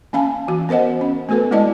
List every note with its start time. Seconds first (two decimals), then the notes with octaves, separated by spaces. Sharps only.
0.13 A#3 C#4 F5 G#5 A5
0.48 E3 F#4
0.69 B3 A#4 C5 D#5 F#5
1.01 C#4
1.29 A3 B3 F#4 A4 B4
1.51 G#3 A#3 E4 D5 D#5 A5